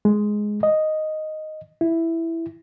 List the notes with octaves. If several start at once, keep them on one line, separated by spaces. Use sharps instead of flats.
G#3
D#5
E4